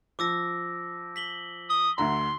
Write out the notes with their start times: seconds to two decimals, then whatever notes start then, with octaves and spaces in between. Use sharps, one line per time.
0.19 F3 D6 E6 A#6
1.16 B6 F#7 G7
1.70 D#6 G7
1.98 D2 D3 A#5 C6